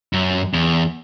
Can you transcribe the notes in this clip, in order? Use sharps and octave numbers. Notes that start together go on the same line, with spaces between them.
F#2
E2